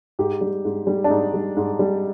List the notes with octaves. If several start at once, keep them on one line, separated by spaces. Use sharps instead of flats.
G#2 G4
G3
G#2
G3
D4
G#2 D#4
G3
G#2
G3